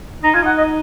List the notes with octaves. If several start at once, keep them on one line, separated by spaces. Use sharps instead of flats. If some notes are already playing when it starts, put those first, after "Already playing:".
D#4 A#5
F4 G#5
D#4 F#5
D#5